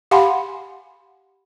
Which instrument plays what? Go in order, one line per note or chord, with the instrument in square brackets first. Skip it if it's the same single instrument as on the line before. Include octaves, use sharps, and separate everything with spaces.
[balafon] G4 F5 F#5 G#5 B5 C6